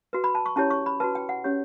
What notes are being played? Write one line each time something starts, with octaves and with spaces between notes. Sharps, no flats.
F#4 B4
B5
A5
C#6
C#4 E4 G4 C#5 A5
C#6
B5
F#4 B4 A5
G5
F#5
C#4 G4 C#5